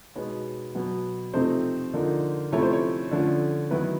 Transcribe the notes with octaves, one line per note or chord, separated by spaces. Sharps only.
B2 G#3 B3 D#4 C#5
B2 F#3 B3
C3 F3 A3 C4 D#4 C5
D3 F3 A#3 D#4
C3 F3 A3 C#4 E4 C#5
C5
C#5
D3 F3 A3 C#4
D#3 F#3 B3 E4 B4